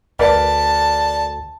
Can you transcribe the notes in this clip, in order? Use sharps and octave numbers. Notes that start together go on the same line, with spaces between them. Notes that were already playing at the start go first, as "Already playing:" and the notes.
D2 A#4 B4 D5 A5